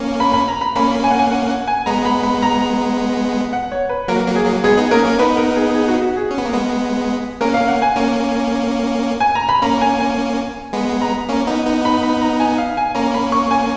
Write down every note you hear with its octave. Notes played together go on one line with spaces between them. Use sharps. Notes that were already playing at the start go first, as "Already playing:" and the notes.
Already playing: A#3 C#4
B5
B5
A#5
B5
A#3 C#4 B5
G#5
F#5
G#5
F#5
F#5
G#5
G#3 B3 A#5
B5
B5
A#5
F#5
C#5
B4
F#3 A#3 A#4
F#3 A#3
G#4
F#3 A#3
G#3 B3 G#4
B3 D#4
A#3 C#4 A#4
A#3 C#4
B3 D#4 B4
A#4
G#4
G#4
F#4
F#4
G#4
C#4
B3
A#3
G#3 B3
A#3 C#4 A#4
F5
F#5
G#5
A#3 C#4
G#5
A#5
B5
A#3 C#4 A#5
G#5
G#5
G#3 B3
A#5
A#3 C#4
B3 D#4
B3 D#4
B5
B5
A#5
G#5
F5
G#5
A#3 C#4 A#5
B5
C#6
G#5